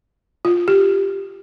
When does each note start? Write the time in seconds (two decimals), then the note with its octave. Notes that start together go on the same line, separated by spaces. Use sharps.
0.45 F4
0.68 G4